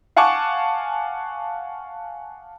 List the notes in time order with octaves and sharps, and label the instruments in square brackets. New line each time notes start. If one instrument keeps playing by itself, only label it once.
[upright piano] F5 F#5 G#5 A5 C#6 D6